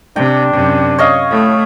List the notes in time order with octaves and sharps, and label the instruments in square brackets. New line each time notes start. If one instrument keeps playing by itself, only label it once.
[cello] C3 [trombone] D4 [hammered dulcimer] G5
[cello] F#2 C3
[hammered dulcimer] C#5 D#5 F5
[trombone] A2 [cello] A3